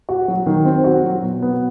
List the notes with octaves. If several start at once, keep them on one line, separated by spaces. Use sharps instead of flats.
F#4
F#3
D#3
C4
F#4
F#3
B2
B3